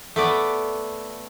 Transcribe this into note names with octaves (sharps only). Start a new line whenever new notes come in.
A3 B3 D5